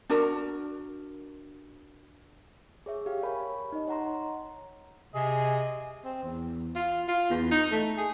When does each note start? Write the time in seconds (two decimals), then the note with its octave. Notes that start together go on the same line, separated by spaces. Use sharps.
0.10 D4 F#4 A#4
2.86 G#4 C#5 E5
3.06 G4 F5
3.23 A#4 C#5 G#5 B5
3.72 D#4 D#5
3.88 C#5 F#5 A#5 C6
5.14 C3 G#4 D#5 G#5
6.04 C4
6.23 E2
6.76 F4
7.08 F4
7.30 E2
7.51 D#4
7.72 A3
7.97 G#4